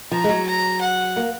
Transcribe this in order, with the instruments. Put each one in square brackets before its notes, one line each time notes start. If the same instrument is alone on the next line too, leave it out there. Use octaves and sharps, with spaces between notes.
[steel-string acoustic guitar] F3 [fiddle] A#5
[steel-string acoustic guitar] G#3
F#3
[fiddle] A#5
F#5
[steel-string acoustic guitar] A#3